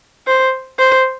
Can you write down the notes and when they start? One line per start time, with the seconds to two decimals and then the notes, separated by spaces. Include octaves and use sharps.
0.27 C5
0.79 C5